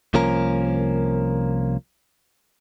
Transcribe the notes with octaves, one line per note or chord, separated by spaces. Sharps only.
C2 F3 A#3 C#4 A#4